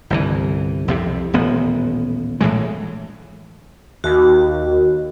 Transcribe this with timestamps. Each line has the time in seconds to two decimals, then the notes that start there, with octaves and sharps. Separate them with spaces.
0.10 G1 C2 E3
0.88 C2 F2 C3
1.33 D#1 A1 B3
2.41 A#1 A2 E3 G#3
4.04 D#2 F#4